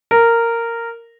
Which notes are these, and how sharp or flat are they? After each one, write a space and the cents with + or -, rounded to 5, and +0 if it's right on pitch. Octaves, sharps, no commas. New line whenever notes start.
A#4 -10